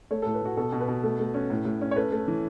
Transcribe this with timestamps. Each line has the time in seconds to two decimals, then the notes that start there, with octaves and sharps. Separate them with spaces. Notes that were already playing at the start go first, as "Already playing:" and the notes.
0.11 A3 C#5
0.22 A4
0.26 A2
0.34 B4
0.42 A2 F#4
0.57 B2 A4
0.72 B2
0.80 B4
0.88 B2
1.04 A3
1.19 A3
1.34 C#4
1.50 A2
1.65 A2
1.81 C#4
1.91 C#5
1.96 A3 B4
2.12 A3
2.28 E3